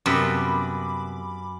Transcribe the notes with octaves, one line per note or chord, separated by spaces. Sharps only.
F#2 C3 G3 B3 B5 D6